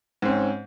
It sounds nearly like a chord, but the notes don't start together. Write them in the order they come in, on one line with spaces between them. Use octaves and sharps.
G#2 C4 C#4